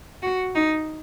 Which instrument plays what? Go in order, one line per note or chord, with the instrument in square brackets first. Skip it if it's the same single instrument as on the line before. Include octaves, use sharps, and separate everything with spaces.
[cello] F#4
D#4